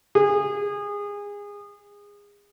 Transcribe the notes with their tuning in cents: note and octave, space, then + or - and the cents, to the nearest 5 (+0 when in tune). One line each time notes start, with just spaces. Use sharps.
G#4 -25